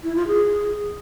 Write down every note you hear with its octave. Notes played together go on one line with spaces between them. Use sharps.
E4
F4
G#4